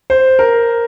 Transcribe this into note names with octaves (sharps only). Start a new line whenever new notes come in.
C5
A#4